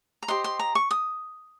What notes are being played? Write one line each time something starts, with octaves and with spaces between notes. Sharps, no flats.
A#5
G4 C5 D#5 C6
C6
A#5
C#6
D#6